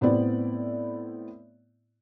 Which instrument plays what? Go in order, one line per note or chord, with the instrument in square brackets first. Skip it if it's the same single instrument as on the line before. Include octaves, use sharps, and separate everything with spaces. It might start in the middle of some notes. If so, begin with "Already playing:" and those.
[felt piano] A2 B3 C4 E4 D5